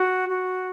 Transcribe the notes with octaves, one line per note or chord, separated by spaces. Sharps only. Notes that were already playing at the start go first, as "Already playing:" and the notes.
Already playing: F#4
F#4